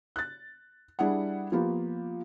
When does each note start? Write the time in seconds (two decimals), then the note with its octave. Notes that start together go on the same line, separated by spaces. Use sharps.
0.16 F#6 A6
0.99 G3 D4 E4 G#4 F#5
1.52 F3 A#3 B3 F4 G4